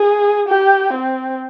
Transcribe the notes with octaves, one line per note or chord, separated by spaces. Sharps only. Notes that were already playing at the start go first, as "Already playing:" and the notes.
Already playing: G#4
G4
C4